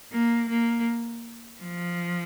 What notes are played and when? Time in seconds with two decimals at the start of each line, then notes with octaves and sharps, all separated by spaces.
0.12 A#3
0.49 A#3
1.61 F3